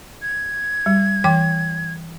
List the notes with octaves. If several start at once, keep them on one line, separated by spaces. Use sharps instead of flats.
G#6
G3
E3 G5 D6